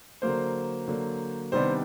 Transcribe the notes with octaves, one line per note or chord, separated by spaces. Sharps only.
D3 F#3 A#3 C5
D3 F#3 A#3
C3 D#3 G3 B3 D4 C5